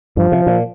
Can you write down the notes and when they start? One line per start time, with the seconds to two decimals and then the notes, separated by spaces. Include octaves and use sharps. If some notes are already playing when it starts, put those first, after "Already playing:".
0.17 G2 F3
0.32 C3
0.47 A#2